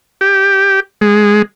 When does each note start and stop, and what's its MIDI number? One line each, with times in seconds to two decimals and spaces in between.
0.21 0.80 67
1.01 1.42 56